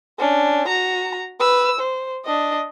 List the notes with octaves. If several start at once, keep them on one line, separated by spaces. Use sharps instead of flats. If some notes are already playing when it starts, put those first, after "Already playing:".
C#4 D4
F#4 A#5
B4 E6
C5
D4 D#5